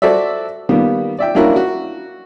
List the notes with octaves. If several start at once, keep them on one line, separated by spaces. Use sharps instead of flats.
F#4 A4 C5 D5 E5
D#3 G3 A#3 B3
D5 E5 G5
A#3 C#4 D4 E4 F#4 A#4
F#4